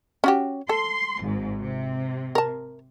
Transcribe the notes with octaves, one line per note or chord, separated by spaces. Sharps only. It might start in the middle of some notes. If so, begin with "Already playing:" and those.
C#4 F#4 G4
A4 C6
G#1 G#2
C3
A#4 A5